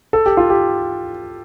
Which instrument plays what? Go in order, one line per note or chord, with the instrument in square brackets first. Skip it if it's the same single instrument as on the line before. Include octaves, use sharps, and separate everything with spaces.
[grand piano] A4
G4
F4
G4